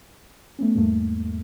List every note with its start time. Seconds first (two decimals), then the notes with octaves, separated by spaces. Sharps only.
0.59 A3 B3 C#4
0.75 E2 G#2 G3 A3 A#3